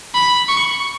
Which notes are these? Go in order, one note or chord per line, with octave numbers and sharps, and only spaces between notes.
B5
C#6